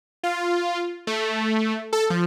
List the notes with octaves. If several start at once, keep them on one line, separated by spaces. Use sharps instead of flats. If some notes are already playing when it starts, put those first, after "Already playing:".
F4
A3
A4
F3